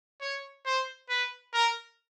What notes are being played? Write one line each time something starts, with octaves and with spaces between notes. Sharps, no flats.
C#5
C5
B4
A#4